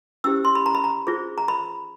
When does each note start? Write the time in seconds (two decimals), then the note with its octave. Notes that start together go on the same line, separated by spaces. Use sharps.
0.24 C#4 E4 G4 C5 E6
0.45 C6
0.55 B5
0.66 A#5
0.75 B5
0.84 A#5
1.07 F4 G#4 C5
1.38 A#5
1.48 B5